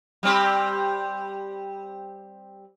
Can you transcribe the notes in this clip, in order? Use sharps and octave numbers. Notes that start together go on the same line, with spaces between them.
G3 C4 G4